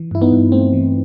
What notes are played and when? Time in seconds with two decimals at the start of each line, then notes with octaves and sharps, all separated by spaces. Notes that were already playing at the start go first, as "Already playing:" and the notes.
Already playing: E3
0.11 G2 E4
0.22 B3 D#4
0.32 G2
0.52 A3 C4
0.73 E3